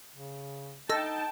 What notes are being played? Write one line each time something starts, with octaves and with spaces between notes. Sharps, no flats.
C#3
D#4 A4 D#5 G5 A5 E6 A#6